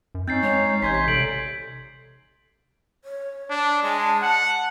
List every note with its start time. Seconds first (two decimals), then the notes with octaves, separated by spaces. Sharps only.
0.15 F#2
0.28 C4 C#4 D#4 G6 A6 C7
0.43 G#3 C#5
0.82 A1 C3 D#4 G#5 C6 G6 G#6 B6
0.94 G6 B6
1.08 D#2 C3 G3 A4 D7 F#7
3.05 C#5
3.50 D4
3.83 G#3 A5
4.22 F#5